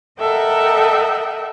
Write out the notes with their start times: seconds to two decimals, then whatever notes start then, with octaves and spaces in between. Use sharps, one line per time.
0.20 A4 A#4 D#5 E5 F#5 G5